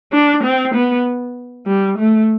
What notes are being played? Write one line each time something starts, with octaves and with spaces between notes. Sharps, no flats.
D4
C4
B3
G3
A3